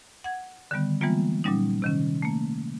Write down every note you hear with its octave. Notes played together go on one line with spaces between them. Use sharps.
F#5 G#6
D3 D#3 G3 B3
E3 G3 G#3 A#3 B3 F4
A#2 F#3 G3 C#4 D#4
C3 D#3 C#4
A3 A#3